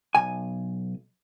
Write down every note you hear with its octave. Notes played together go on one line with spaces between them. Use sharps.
B1 G#5